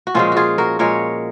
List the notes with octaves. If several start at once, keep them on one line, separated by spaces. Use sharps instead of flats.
F#4
A#2 F3 G#3 C#4 F4
F4 F#4 G#4
F#4 A#4
A#2 G#3 A#4 C#5